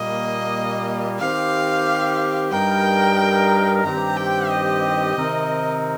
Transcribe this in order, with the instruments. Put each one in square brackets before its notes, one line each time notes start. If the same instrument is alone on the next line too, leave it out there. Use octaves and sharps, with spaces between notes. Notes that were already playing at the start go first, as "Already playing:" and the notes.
Already playing: [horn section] A#2 G3 A#3 [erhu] D#5
[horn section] D#3 C4 G4 [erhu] F5
[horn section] G2 G3 D#4 A#4 [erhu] G5
[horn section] G2 D#3 C4 G4 C5 [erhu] A#5
[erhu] G5
D#5
[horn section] C3 D#3 C4 D#4 A#4